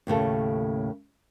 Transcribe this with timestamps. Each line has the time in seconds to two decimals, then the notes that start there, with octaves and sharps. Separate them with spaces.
0.07 D#2 A2 C#3 A4